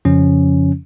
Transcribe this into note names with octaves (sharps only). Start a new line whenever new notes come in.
F2 C#3 F3 C#4